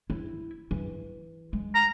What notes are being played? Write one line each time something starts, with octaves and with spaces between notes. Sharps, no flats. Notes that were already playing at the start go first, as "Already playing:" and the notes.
E4
E3
G#3
A#5